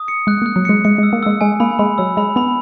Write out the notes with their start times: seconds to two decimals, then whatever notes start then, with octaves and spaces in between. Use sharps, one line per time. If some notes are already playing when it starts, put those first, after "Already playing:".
Already playing: D#6
0.08 C#7
0.27 G#3 F#6
0.42 A#3 F#6
0.56 F#3
0.65 G#3 C#7
0.84 G#3 C#7
0.98 G#3 E6
1.13 A#3
1.23 G#3 E6
1.41 G#3 G#5
1.60 A#3 B5
1.79 G#3 B5
1.98 F#3 E6
2.17 G#3 B5
2.36 B3 B5